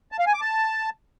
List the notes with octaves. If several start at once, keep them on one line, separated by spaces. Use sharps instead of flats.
A5
F5
G#5
D6
A5